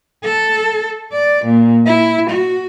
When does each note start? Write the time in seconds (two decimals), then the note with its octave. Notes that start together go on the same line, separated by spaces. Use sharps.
0.24 A4
1.12 D5
1.45 A#2
1.86 E4
2.30 F#4